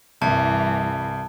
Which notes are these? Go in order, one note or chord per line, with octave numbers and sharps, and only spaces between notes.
C2 G2 E3 A5